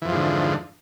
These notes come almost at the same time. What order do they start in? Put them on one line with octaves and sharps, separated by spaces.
E3 F2 F3 G#2 D3